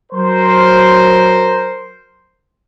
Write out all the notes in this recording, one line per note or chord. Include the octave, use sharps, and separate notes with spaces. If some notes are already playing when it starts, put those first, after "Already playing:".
F#3 A#4 C5